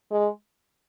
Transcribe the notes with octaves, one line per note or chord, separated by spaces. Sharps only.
G#3